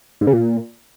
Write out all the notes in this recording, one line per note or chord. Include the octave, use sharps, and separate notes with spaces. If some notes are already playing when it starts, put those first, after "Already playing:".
G#2
C#3
A#2